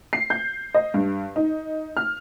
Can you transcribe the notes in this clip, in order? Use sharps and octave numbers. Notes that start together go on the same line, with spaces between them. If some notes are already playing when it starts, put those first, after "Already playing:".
C7
G6
D#5
G2
D#4
F6